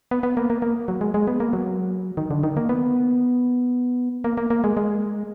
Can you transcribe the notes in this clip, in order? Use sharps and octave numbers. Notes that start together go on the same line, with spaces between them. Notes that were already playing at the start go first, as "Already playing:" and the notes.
B3
B3
A#3
A#3
A#3
F#3
G#3
G#3
B3
A#3
F#3
D#3
D3
D#3
A#3
B3
A#3
A#3
A#3
G#3
G#3